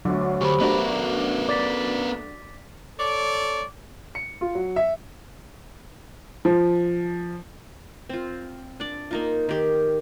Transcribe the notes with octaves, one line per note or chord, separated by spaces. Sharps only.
D2 D3 F#3
D2 G4 C5 B5 C#6
A3 B3 D4 F#4 A#4 E5
D5 D6 A6 B6
A4 C#5 D5
C#7
F4
F#3
E5
F3
C4 F4
D4 D5
A#3 D#4 F4
D#3 G4